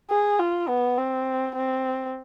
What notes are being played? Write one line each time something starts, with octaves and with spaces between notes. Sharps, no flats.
G#4
F4
B3
C4
C4